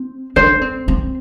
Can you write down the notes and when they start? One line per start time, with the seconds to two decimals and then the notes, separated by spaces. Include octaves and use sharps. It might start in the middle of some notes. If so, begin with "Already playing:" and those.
Already playing: C4
0.36 D4 C5
0.61 C4
0.88 C4